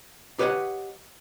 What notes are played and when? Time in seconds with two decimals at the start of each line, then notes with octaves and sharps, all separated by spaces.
0.39 G4 B4 C#5 D#5 F#5